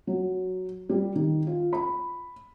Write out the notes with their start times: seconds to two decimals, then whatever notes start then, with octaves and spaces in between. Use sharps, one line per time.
0.07 F#3
0.89 G3
1.15 D#3
1.47 F4
1.73 B5